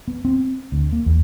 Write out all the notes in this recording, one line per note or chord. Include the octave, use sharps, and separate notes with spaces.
B3
C4
D2
A#3
E2